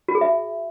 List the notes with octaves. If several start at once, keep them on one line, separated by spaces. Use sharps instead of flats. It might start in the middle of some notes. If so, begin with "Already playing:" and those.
F#4
G#4
E5